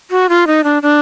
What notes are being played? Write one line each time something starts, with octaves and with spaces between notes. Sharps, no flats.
F#4
F4
D#4
D4
D4